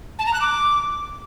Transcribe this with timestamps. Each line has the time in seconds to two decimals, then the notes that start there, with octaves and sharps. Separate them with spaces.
0.19 A5
0.26 A#5
0.33 F#6
0.41 D6